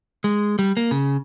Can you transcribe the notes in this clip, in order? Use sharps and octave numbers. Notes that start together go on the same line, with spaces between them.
G#3
G3
A#3
C#3